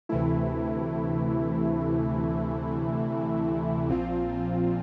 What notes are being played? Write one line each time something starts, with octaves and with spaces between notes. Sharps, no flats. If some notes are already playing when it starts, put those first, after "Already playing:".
D2 C3 E3 A3 E4
A#1 A#2 F3 C4 F4